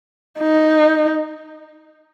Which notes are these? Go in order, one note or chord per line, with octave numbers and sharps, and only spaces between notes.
D#4